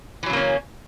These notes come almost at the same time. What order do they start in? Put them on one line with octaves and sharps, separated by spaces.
E3 F#3 C#3 A#3 C#4